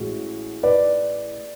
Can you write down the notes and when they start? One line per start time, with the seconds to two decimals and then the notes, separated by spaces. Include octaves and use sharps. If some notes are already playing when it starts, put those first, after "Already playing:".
Already playing: A1 A2 G#3 F#4
0.63 B4 D5